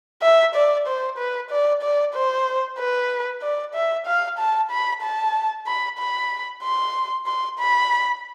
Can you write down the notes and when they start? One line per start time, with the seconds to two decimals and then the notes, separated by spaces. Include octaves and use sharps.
0.22 E5
0.55 D5
0.87 C5
1.18 B4
1.50 D5
1.82 D5
2.14 C5
2.78 B4
3.42 D5
3.74 E5
4.06 F5
4.39 A5
4.71 B5
5.02 A5
5.67 B5
5.98 B5
6.63 C6
7.26 C6
7.59 B5